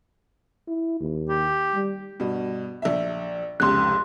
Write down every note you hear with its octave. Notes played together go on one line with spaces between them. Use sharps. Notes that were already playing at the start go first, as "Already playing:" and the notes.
E4
D#2
G4
G3
G2 B2
A#1 E5
F1 C#2 G4 C6 F#6